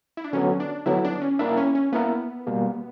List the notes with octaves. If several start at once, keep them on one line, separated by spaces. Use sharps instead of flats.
E4
D4
D3 F#3 B3 C#4
D4
D3 F#3 B3 E4
D4
C#4
A#3 D4 E4 A#4 E5
C#4
C#4
A#3 B3 E4 A#4 E5
B2 G3 A#3